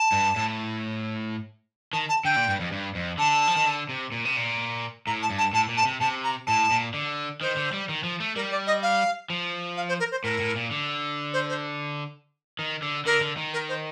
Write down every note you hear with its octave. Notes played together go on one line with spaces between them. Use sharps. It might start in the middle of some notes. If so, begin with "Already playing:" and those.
Already playing: A5
G2
A2
D#3 A5
A5
D3 G5
A#2
G2
F2
G2
F2
D3 A5
F3
D#3
D3
C3
A#2
C3
A#2
A2 A#5
A5
G2
A5
A2 A5
A#2
A5
C3
C3 A5
A#5
A2 A5
A#2
D3
D#3 C5
D3
G3
D#3
F3
A3
G3 A#4
D5
D#5
F5
F3
F5
C5
A#4
C5
A2 A#4
A2
A#2
D3
C5
C5
D#3
D3
D3 A#4
D3
D#3
A#4
C5